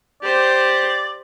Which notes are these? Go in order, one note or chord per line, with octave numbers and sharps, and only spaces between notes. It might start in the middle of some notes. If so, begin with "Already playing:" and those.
G4 C5 D5